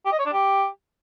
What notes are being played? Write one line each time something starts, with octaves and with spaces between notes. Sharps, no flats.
G4
D#5
C#5
D4
G4